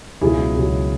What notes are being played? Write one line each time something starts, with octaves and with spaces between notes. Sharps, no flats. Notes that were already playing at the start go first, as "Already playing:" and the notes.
C#2 B2 F#3 E4 G#4
C#2 B2 F#3